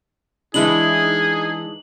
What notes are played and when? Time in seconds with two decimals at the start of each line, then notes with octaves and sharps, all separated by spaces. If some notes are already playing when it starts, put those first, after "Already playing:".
0.54 E3 G#3 D4 E4 G#4 F#7
1.04 D#4